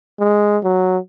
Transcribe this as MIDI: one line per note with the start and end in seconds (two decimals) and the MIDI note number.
0.20 0.58 56
0.64 0.98 54